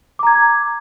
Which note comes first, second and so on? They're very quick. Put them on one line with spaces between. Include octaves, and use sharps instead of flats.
D6 A#5 G#6